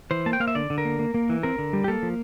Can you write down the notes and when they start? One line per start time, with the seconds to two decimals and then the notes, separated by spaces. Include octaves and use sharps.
0.11 E3 C5
0.26 A#3 A5
0.33 G5
0.40 A#3 F5
0.48 E5
0.55 D3 D5
0.70 D3
0.78 A#4
0.85 A#3
0.99 A#3
1.14 A#3
1.29 E3
1.43 C4 A#4
1.58 D3
1.73 G3
1.84 G4
1.88 A#3 A4
2.03 F3